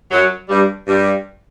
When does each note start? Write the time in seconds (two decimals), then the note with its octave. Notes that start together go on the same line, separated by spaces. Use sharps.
0.11 F#2 F#3
0.49 G2 G3
0.87 G2 G3